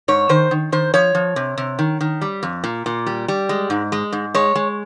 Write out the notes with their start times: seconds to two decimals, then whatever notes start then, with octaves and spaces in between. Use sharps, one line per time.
0.08 G#2 C#5
0.29 D#3 C5
0.51 D#3
0.72 D#3 C5
0.94 F3 C#5
1.15 F3
1.36 C3
1.58 C3
1.79 D#3
2.01 D#3
2.21 G3
2.43 F2
2.64 A#2
2.86 A#2
3.06 G3
3.28 G3
3.49 G#3
3.70 G#2
3.92 G#3
4.13 G#2
4.34 G#3 C#5
4.55 G#3